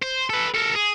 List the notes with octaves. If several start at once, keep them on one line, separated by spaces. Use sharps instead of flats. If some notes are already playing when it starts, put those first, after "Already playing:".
C5
A4 B4
A4 A#4
G#4